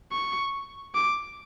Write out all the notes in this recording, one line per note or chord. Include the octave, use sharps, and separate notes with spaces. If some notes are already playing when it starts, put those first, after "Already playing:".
C#6
D6